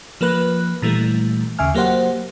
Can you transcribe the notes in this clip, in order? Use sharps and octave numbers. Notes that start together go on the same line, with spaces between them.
F3 A#3 B4 F#6
A#2 E3 G3 A3
D#2 C#3 E5 G#5 F6
F#3 A#3 G4 C5 F#5